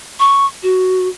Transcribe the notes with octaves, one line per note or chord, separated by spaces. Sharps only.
C#6
F#4